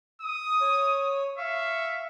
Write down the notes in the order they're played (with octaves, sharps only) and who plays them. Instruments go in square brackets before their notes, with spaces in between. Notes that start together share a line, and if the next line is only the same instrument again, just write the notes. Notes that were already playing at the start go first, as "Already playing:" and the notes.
[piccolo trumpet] D#6
[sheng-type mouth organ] C#5
[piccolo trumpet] E5 [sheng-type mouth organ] F5 C#6